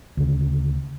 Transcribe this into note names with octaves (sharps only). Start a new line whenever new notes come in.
D2 C#3